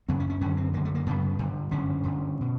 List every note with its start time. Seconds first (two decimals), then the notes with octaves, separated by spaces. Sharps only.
0.09 F#2 C#3 C4
0.20 C#4
0.30 C#4
0.41 F#2 D3 C#4
0.57 C4
0.73 F#2 D3 A#3
0.85 A3
0.95 A#3
1.06 F#2 C#3 B3
1.39 G2 D3
1.71 F#2 D3 C#4
2.03 G2 D3
2.41 B2